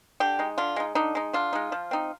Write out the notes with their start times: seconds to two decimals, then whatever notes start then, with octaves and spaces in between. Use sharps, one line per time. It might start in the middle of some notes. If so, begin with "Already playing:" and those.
0.20 D3 G4
0.39 G#3 D#4
0.58 D3 F4
0.76 G#3 D#4
0.95 D3 D#4
1.15 G#3 D#4
1.33 D3 F4
1.53 G#3 D#4
1.72 F3
1.91 C4 D#4